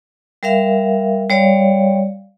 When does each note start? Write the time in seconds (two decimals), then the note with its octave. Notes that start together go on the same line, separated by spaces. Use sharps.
0.43 G3 A#4 E5 F5
1.30 G3 C#5 D5 F5